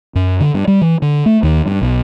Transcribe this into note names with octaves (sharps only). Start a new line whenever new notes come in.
F#2
D3
G2
G3
E3
D3
A3
D#2
G2
B1